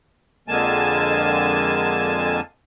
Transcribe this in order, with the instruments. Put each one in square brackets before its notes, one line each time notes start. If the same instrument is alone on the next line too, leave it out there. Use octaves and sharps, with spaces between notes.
[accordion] F2 D3 G#3 A#3 G#5 A5